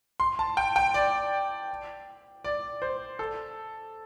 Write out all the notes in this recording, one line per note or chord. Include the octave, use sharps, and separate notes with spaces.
C6
A5
G5
G5
D5
D5
C5
A4